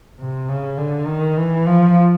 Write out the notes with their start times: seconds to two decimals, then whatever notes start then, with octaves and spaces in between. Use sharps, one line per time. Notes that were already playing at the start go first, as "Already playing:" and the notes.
0.20 C3
0.49 C#3
0.78 D3
1.08 D#3
1.37 E3
1.67 F3